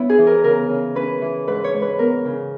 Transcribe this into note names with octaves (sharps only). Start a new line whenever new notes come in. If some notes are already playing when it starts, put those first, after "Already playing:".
Already playing: B3 E4 C#5
G#4
E3
A#4
C#3 A#4
C#3
C#4 B4
E3
G#2 B4
C#5
G#2
B4
B3 A#4
C#3